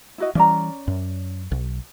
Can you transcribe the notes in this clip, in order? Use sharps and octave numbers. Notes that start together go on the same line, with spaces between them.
E4 F#4 D#5
E3 G3 C#4 D5 A#5
F#2
B1